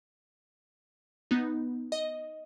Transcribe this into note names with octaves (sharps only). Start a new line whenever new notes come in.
B3 D#4
D#5